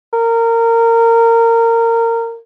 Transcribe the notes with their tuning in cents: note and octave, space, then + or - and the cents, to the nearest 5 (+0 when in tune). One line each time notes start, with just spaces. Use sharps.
A#4 -20